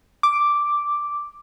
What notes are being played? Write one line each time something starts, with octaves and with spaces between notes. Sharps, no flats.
D6